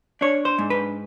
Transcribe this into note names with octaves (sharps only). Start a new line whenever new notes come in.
D4 C#5
C5
G#2
B4